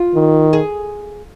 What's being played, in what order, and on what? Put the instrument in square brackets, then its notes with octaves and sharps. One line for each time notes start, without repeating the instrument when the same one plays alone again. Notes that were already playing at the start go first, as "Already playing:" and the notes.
Already playing: [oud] F4
[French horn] D#3
[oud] G#4